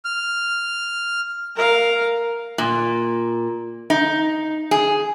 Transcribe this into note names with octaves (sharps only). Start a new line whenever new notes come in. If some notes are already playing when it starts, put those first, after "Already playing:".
F6
A#4 F5
A#2
D#4
G#4